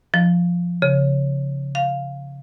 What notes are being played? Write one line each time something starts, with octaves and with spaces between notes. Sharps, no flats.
F3
C#3
F5